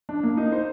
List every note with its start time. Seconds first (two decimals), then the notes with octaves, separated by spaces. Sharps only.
0.09 D4
0.23 A#3
0.37 D#4
0.52 C5